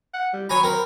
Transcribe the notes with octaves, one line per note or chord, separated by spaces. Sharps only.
F#5
G3
F#3 C#5 G#5 A#5 B5
C4 A#4